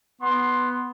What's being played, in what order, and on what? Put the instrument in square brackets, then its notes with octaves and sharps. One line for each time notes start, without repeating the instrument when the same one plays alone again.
[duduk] B3 [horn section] C6